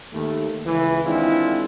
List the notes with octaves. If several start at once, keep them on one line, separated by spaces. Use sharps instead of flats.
D#2 A3
C#2 E3
D#3 G#3 C4 D4 E4 F4